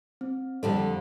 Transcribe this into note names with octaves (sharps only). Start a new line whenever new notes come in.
C4
F2 D3 G3 A4